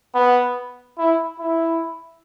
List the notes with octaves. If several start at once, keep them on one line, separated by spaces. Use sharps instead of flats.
B3
E4
E4